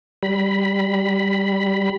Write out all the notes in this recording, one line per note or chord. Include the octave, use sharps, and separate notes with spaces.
G3 B5